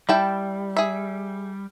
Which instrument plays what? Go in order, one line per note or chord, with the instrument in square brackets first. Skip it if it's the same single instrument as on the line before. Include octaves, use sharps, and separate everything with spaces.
[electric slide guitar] G3 [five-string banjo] E4 G5 A5
[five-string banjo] G#4 E5